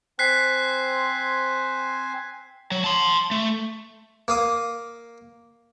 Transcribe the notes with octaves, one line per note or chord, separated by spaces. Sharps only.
C4 C5 G#5 F#6 B6 C7
F#3
A5 C6
A3
A#3 F5 D#6